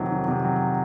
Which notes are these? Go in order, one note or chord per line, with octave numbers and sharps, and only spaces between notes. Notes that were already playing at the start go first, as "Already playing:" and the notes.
Already playing: F2 C3 D#3 F#3
D#3
C3
F#3